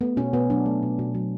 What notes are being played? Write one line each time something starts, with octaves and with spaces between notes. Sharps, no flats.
A3 B3
B2 C#4
B2 B3
F#3 D4
A3
B2
B2
F#3